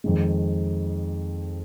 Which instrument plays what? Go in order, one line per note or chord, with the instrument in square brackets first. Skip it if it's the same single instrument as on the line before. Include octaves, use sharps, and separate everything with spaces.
[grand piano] F2 D#3 G#3